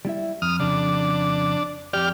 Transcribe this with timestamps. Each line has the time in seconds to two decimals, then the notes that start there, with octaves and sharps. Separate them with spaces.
0.05 G3 E4 E5
0.42 F2 D#6 F6
0.60 F2 C#3 D4
1.93 F2 G4 D5 F6